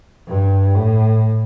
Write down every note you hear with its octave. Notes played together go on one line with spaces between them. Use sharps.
G2
A2